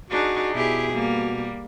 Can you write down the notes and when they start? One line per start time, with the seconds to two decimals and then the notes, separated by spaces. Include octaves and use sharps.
0.10 D4 D#4 F#4 G#4
0.54 B2 E4 G4 G#4
0.93 G3 A#3